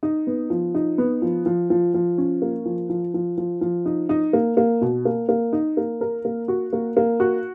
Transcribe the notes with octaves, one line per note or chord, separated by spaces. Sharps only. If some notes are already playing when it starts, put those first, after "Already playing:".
D#4
B3
F3
D#4
B3
F3
F3
F3
F3
C#4
A#3
F3
F3
F3
F3
F3
D#4
D#4
A#3
A#3
B2
A#3
A#3
D#4
A#3
A#4
A#3
F#4
A#3
A#3
F#4